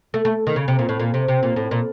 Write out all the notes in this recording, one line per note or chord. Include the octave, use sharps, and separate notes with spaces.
A3
A3
D#3
C#3
C3
A#2
A2
A#2
C3
C3
A#2
A2
A#2